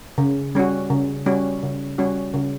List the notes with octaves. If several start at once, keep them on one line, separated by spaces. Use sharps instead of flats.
C#3
G3 C#4 F#4
C#3
G3 C#4 F#4
C#3
G3 C#4 F#4
C#3